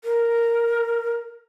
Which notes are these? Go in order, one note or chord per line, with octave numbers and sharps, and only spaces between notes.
A#4